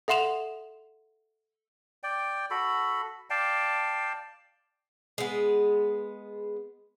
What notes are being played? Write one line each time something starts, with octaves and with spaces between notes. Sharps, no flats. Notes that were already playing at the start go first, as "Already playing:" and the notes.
A4 E5 F#5 C6 E7 F7
D5 G5
F#4 A4 B5
D5 F5 G5 A5
G#3 B3